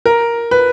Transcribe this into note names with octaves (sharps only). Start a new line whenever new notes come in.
A#4
B4